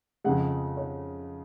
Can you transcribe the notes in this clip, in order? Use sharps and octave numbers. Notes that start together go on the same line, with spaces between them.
F2 C#3 G#3 F#5
C#5